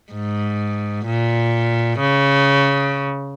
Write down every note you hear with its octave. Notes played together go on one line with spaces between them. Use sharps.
G#2
A#2
C#3